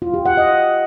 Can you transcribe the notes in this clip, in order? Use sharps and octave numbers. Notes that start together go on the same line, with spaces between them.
F4
G4
F#5
D#5